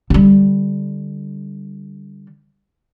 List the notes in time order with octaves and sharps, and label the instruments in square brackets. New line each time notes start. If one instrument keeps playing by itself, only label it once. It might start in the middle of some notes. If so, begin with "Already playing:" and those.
[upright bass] D3 G3